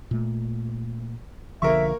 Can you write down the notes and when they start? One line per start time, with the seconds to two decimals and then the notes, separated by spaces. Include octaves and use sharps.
0.11 A#2 A3
1.62 B1 D3 F3 A#3 A#4 E5 C#6